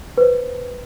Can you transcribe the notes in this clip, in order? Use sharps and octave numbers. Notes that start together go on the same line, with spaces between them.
B4 C5